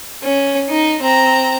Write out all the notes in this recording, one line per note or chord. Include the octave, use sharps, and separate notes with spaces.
C#4
D#4
C4 A#5